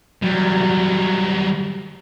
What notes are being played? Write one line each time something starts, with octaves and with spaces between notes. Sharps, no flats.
F#3 G3